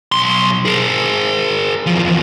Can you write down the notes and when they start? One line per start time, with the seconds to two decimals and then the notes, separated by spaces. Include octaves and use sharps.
0.12 B1 C6
0.65 G#4 A#4
1.86 E2 F3